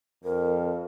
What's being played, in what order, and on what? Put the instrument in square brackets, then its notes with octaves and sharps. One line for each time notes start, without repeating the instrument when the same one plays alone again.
[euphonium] F2 [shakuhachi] A#4